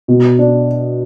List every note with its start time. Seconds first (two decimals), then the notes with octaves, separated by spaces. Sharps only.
0.08 B2
0.39 D4